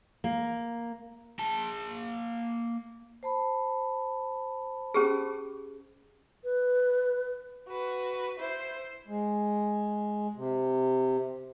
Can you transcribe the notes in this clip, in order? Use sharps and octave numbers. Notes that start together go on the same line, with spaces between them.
A#3
A#3 A5
C5 A5 B5
C#4 G4 G#4
B4
F#4 B4
E4 C5
G#3
C3